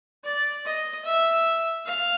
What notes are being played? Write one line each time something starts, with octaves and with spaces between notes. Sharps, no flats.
D5
D#5
E5
F5